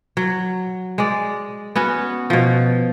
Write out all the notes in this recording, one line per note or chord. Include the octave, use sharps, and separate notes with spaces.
F#3
G#3 D5
B3 C#4 F#4
B2 F3